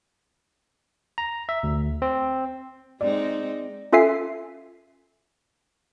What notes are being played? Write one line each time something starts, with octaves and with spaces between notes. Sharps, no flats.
A#5
E5
D2
C4
G#3 C4 D#4 D5
C#4 F4 A4 E5 G#5 C7